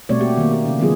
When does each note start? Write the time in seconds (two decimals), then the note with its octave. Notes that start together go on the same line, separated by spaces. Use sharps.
0.09 B2 G3 A3 C4 C#5 D5
0.20 A#3 F#4 G4
0.37 D#3 A#3
0.53 G4
0.65 C#3 C#4
0.79 D#3 F3 F#3 B3 F4 G#4